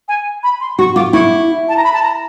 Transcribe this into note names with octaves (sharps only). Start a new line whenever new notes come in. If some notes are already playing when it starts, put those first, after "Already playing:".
G#5
B5
C6
F#4 C#6
F4 D6
E4 C#6
A5
A#5
B5
A5
A#5